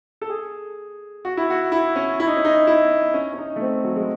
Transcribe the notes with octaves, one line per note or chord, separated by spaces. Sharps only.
A4
G#4
F#4
E4
F#4
E4
C#4
E4
D#4
C#4
D#4
E4
C#4
C#4
D#4
A3
C4
F#3
G#3